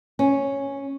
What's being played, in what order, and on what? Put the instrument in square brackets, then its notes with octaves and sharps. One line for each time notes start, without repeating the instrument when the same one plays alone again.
[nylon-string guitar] C#4